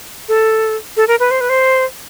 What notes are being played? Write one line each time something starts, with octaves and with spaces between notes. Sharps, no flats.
A4
A4
A#4
B4
C5
B4
C5